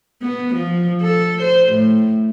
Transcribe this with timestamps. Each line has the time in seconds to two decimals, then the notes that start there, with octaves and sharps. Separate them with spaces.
0.22 B3
0.54 F3
1.01 A4
1.42 C5
1.72 A2